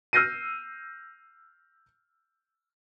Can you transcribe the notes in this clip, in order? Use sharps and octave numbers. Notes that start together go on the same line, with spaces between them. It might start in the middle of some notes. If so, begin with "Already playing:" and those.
E6 F6 G6 A#6 C7 D#7